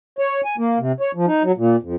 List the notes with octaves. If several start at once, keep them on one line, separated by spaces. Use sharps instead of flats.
C#5
G#5
A#3
C3
C#5
F3
D#4
F#3
A#2
F2